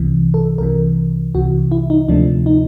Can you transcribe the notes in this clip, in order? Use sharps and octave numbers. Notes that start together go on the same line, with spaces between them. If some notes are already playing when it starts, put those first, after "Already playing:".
Already playing: C2 C3 E3
A4
C2 C3 E3 A#4
C2 C3 E3 F#4
E4
D#4
D2 C3 F3 A3 D4
D#4